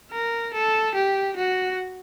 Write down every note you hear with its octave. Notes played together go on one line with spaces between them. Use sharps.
A#4
A4
G4
F#4